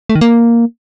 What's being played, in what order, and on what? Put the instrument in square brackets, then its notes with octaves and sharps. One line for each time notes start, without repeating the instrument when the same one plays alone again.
[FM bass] A3
D#3
A#3